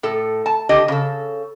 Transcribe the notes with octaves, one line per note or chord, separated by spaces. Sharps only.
A2 A4
A5
D3 G4 D#5
C#3 A4